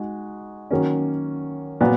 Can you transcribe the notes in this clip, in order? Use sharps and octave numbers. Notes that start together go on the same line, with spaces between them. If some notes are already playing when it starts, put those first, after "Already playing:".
Already playing: G#3 D#4 F#4
D#3 F#3 A#3 C#4
A#2 F#3 B3